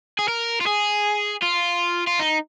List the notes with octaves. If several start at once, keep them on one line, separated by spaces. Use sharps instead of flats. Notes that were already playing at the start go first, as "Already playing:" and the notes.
G#4
A#4
F4
G#4
F4
F4
D#4